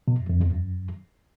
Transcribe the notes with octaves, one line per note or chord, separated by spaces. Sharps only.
B2
F#2
F2
E2
F#2